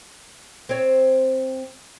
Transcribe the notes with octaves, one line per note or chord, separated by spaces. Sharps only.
C4 C#5